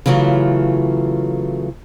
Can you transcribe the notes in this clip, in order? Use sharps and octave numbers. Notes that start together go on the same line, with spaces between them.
C#3 E3 F#3 A3 F4